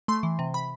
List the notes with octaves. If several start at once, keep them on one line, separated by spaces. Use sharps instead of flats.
A3 C6
E3
C3
B5